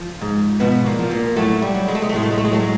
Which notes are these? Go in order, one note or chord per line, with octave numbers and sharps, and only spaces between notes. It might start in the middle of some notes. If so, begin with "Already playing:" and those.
Already playing: F3
G#2
B2 F3 B3
A#2 A#3
F3
A#2 A#3
A2 F#3 A3
G3
F#3
G#3
A3
G#3
A3
A2 G#3
A3
G#3
A3
G#3
F#3 A3
G#3